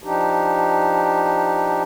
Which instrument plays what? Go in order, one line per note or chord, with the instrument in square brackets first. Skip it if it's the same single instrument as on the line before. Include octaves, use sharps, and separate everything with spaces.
[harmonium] F3 D4 D#4 G4